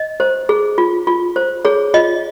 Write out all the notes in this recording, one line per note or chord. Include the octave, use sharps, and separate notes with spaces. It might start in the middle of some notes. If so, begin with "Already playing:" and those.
Already playing: D#5
C5
G#4
F4
F4
C5
G#4 C#5
F4 D#5